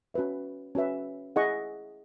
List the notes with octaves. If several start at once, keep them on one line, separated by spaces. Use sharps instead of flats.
C#4 F#4 B4 E5
C#4 F#4 B4 E5
E4 G#4 D#5 F#5 C#6